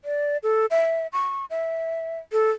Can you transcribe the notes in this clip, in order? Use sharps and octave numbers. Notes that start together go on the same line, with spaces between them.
D5
A4
E5
C#6
E5
A4